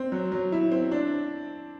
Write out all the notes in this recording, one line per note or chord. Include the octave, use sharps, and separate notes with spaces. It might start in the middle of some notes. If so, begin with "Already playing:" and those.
Already playing: C4
F#3
F#3
E4
C4
D4